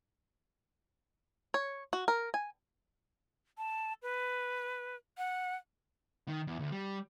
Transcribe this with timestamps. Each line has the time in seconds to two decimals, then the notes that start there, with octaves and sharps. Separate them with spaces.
1.54 C#5
1.93 F#4
2.08 A#4
2.34 G#5
3.58 A5
4.02 B4
5.18 F#5
6.28 D#3
6.47 E2
6.59 D2
6.72 G3